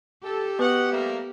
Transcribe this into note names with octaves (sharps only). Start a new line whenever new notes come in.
G4 A4
B3 F#4 B4 D#5 F#5
G3 A3 A#3